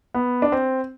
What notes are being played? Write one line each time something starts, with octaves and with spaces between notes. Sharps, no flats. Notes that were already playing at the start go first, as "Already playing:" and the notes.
B3
D4
C4